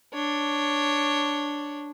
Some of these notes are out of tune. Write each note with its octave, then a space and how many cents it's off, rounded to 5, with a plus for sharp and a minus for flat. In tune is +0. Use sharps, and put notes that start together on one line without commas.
D4 +0 C#5 +0